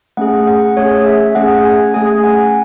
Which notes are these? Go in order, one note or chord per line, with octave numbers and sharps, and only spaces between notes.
A3 C#4 G#4 F#5
F#5
A3 C#4 G#4 C#5
E5
A3 C#4 G#4 F#5
G#5
A3 C#4 G#4 G#5
G#5
F#5